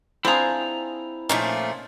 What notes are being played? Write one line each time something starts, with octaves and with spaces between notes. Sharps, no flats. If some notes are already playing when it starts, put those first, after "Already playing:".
C4 D4 E4 F4 G#4 A#5
A#2 F3 A3 C#4 D#4